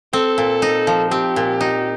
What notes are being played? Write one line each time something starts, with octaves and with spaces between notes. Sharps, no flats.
C4 A4
A#2
D#4
F3
C4 G4
A#2
D#4